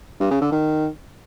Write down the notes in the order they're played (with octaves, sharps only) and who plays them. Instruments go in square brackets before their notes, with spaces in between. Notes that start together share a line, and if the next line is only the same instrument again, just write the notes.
[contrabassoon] G2
C#3
D3
D#3